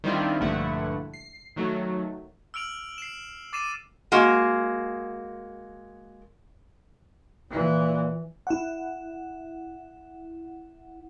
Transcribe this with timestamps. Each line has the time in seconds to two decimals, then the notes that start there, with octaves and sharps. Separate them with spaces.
0.04 D#3 G3 C4 D4 E4 F4
0.40 A#1 G2 D3 A3 E4 F#5
1.14 C7
1.56 D#3 F#3 A3
2.54 E6 F6 D7 F7 F#7
2.98 C7 E7
3.53 D6 A6 C7 D#7 E7
4.12 G#3 A#3 F#4
7.51 A#2 E3
8.47 E4 F#5